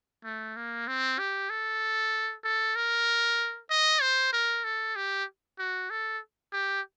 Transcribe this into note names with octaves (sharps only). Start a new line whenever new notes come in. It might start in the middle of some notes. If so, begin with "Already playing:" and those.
A3
A#3
C4
G4
A4
A4
A#4
D#5
C5
A#4
A4
G4
F#4
A4
G4